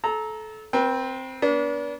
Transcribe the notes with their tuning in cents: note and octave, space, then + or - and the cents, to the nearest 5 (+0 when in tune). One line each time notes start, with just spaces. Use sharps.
A4 -25 A#5 +0
C4 +0 B4 -40
B3 -40 D4 -35